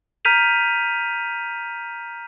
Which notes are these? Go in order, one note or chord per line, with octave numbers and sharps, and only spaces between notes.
A#5 F6 G6 B6 D#7 F7